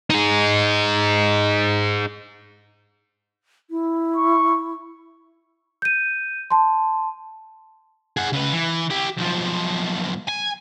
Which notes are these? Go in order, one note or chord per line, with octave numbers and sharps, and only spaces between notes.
D#4 G#4
E4
C#6
G6 D#7
A5 C6
G#4 F#5
C#3 B4
E3
E4 G4
B1 F3
G#5